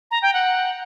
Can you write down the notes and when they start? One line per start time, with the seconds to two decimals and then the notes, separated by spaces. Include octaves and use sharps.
0.11 A#5
0.22 G5
0.34 F#5